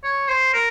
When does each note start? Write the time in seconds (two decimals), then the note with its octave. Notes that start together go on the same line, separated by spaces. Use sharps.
0.04 C#5
0.28 C5
0.54 A#4